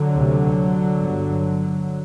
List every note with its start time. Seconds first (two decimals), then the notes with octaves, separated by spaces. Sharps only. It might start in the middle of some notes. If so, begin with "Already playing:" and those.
Already playing: D3 F#3
0.14 D2 C3
0.98 G1 G2